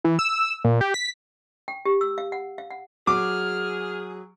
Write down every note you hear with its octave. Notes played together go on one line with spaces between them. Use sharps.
E3
E6
A#2
G4
B6
G5
G4
E6
F5
F#5
F5
F#5
F#3 G#4 D6 F6